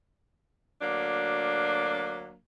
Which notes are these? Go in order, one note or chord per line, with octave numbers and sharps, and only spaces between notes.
D2 F#3 A#3 D4